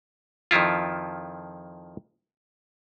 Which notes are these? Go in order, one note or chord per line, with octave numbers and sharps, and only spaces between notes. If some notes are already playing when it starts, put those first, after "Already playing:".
F2 D#3 F3 E4 F4